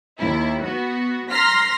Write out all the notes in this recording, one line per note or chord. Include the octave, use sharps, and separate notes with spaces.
D#2 E4
B3 F#4
A#5 C6 F6 A#6 B6